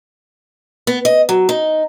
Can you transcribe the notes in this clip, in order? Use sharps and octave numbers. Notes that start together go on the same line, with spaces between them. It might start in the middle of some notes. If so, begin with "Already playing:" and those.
B3
D#5
F#3
D#4